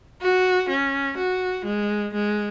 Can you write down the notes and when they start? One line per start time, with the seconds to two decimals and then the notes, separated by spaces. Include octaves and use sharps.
0.21 F#4
0.69 C#4
1.18 F#4
1.65 G#3
2.14 G#3